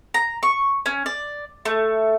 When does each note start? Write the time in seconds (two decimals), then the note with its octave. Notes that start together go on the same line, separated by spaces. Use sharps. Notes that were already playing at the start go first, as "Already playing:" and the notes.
0.14 A#5
0.43 C#6
0.86 C#4
1.06 D5
1.65 A3